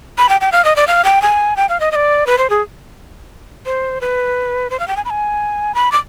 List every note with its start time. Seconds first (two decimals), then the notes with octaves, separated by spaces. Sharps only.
0.18 B5
0.29 G5
0.41 G5
0.52 F5
0.65 D#5
0.76 D5
0.87 F5
1.04 G5
1.22 G#5
1.56 G5
1.69 F5
1.80 D#5
1.91 D#5
1.95 D5
2.27 B4
2.38 C5
2.50 G#4
3.66 C5
4.01 B4
4.70 C5
4.79 F5
4.88 G5
4.96 G#5
5.05 B5
5.10 G#5
5.75 B5
5.92 D6